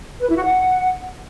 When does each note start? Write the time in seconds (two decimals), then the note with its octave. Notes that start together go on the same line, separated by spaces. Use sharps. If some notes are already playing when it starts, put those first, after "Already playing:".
0.21 B4
0.29 E4
0.37 F#4
0.44 F#5